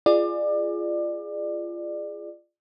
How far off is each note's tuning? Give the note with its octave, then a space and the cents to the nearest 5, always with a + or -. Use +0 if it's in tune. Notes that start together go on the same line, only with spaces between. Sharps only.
F4 -25 G#4 +0 D5 +25